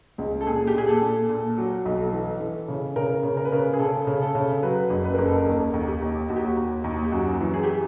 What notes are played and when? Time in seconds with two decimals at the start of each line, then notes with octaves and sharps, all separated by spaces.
0.18 C#2
0.41 A4
0.46 A#2 G#4
0.67 G4
0.74 A#2 G#4
0.88 A4
1.02 A#2
1.29 A#2
1.57 F#3
1.85 B1
2.12 E3
2.40 E3
2.68 C#3
2.96 C#3 A#4
3.23 C#3
3.37 A#4
3.45 B4
3.52 C#3 A#4
3.74 G#4
3.79 C#3 A4
4.07 C#3
4.22 A4
4.35 C#3
4.63 F#3 B4
4.90 F#1
5.05 B4
5.14 F#1 A#4
5.25 A4
5.35 A#4
5.46 D#2 A4
5.74 D#2
5.87 G4
6.02 D#2
6.29 D#2 F#4
6.36 G4
6.45 F#4
6.57 D#2
6.84 D#2
7.05 G4
7.12 F#2 F#4
7.41 E3
7.54 G#4
7.64 G4